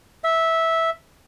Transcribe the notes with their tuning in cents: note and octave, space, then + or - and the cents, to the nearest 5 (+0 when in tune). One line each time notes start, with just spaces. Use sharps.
E5 -10